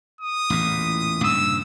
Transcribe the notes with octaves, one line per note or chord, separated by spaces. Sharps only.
D#6
A1 E2 A#2
G2 A#2 C#3 E6